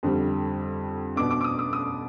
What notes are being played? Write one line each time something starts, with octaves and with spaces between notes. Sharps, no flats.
F2 D3 G3
B2 B3 D4 D6
D6
D6
D#6
D#6
D#6